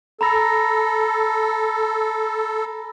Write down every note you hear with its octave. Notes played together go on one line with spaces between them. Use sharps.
A4 A#5 B5 A#6